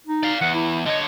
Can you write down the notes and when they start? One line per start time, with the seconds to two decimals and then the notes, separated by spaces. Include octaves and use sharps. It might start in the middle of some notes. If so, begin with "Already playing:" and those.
0.07 D#4
0.23 D5 F5
0.41 E2 F#5
0.54 E4
0.86 D3 C#5 D#5